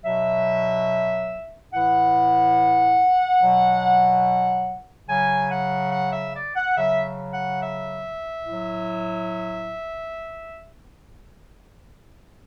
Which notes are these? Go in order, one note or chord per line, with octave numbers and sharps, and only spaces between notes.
B2 F#3 E5
A2 E3 F#5
B2 F#3
C#3 F#3 G#5
F#5
F#5
E5
D5
F#5
C#3 F#3 E5
F#5
E5
A2 F#3